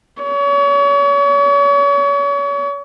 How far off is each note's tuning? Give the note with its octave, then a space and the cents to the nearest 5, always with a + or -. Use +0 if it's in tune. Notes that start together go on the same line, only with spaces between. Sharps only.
C#5 +35